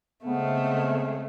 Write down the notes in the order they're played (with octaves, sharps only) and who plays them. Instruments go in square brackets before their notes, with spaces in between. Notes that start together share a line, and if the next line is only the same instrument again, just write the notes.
[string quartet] C#3 A3 [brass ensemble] G#3 C4 F5 [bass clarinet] B3